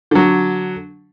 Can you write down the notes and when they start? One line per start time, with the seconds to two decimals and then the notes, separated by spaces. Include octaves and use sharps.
0.11 D3 F#3